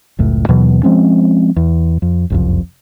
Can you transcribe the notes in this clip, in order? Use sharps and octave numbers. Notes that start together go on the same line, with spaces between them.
F#1 C#2 A2
D#2 B2 E3 F#3
F3 G#3 C4 C#4
E2
F2
F#1 C2 F2